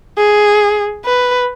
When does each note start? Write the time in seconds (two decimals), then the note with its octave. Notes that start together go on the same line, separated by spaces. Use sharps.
0.17 G#4
1.05 B4